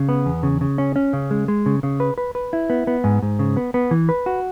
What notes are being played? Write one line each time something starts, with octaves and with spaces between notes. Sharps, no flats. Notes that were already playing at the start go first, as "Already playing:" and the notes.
Already playing: C#3
B3
E2
C#3
C#3
C#4
C#4
C#3
G#3
G#3
C#3
C#3
B4
B4
B4
E4
B3
B3
G#2
G#2
C#3
B3
B3
E3
B4
F#4